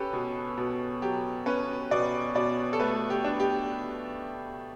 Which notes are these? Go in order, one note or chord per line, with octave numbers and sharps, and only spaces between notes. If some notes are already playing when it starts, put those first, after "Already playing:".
Already playing: C#4 G4 A4 B4
B2
B2
F#3 G4
C#4 B4
B2 D5
B2 D5
A4
A3 B4
G4
D4
G4